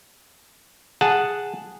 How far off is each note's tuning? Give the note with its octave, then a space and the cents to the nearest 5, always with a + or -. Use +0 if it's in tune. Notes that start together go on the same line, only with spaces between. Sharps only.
G#4 -10 F#5 +0 A5 +0